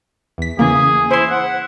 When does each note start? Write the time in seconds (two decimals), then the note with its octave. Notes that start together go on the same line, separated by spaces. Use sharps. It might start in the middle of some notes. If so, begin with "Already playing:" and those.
0.38 E2 B6
0.59 C#3 E3 A#3 G#4
1.11 E4 C5 C6
1.30 F#5